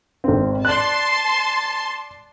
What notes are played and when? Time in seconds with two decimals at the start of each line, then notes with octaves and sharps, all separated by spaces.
0.24 G#1 C4
0.65 D5 A5 C6 F#6